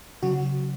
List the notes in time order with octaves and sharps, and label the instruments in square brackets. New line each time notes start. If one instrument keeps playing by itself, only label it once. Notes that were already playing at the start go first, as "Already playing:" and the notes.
[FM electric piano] C#3 F#3 F#4